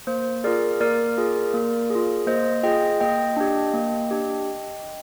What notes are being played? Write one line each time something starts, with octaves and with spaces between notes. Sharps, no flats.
A#3 C5
F4 G#4 A#4 D5
A#3 A#4 D5
F4 G#4
A#3
G#4
F4
A#3 C5 D#5
F4 G#4 D#5 G5
A#3 D#5 G5
D4 G4
A#3
D4 G4